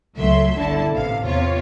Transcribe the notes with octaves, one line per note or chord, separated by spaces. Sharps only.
C#2 F#3 A3 E5 C6
G1 D3 E4 A5
A1 C3 F5
E2 C3 F4 C#5